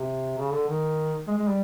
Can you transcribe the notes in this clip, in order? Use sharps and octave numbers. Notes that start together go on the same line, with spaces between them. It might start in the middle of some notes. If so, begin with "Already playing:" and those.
Already playing: C3
C#3
D3
D#3
G#3
G#3
G3